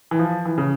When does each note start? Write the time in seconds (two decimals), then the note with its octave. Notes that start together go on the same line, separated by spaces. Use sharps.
0.11 E3
0.19 F3
0.45 E3
0.58 C#3